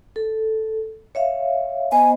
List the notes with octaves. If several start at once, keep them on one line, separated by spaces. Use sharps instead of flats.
A4
C#5 E5 F5
B3 C5 D#5 G#5